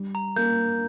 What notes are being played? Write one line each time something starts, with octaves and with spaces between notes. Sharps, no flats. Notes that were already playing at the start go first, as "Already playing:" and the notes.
Already playing: G3
A#5
A#3 G6